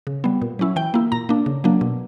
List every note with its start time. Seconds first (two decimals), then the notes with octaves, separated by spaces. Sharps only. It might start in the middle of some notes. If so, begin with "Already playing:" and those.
0.07 C#3
0.24 G3 B3
0.42 A#2
0.59 F#3 C#4 E4
0.76 E3 G5
0.94 A#3 E4
1.12 A#2 A#5
1.29 A#3 D4
1.46 C#3
1.64 F#3 A#3 D4
1.81 B2